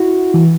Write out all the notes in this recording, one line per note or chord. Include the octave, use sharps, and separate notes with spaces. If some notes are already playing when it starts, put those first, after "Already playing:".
Already playing: E4 F#4
E3